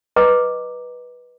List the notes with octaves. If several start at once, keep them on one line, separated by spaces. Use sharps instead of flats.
B4 D#5 A#5 D6